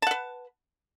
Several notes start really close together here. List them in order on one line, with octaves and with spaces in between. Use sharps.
A5 F#5 B4